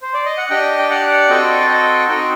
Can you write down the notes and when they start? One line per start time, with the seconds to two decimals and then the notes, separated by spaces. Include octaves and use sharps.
0.02 C5
0.14 D5
0.26 D#5
0.38 F#5
0.50 D4 G4 D#5 G5
0.79 G5
0.90 D5 F#5
1.29 C4 F#4 A4 D#5 G5
1.61 A5
1.68 D#5 G5
2.08 C4 D#4 F#4 D#5 G5